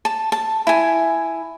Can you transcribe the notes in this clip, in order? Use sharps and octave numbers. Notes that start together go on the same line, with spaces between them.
A5
A5
E4 G#5